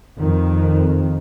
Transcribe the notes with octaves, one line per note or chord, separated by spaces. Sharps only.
F2 D#3